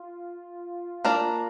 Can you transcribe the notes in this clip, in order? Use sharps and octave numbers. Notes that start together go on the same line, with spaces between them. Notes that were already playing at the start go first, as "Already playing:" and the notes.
Already playing: F4
A#3 D4 A#4 D5